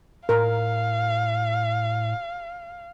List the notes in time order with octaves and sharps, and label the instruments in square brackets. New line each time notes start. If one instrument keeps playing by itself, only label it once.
[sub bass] A2 [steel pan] A#4 [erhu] F5